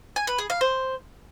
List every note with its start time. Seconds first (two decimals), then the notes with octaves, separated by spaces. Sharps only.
0.16 G#5
0.27 B4
0.39 G#4
0.50 F5
0.61 C5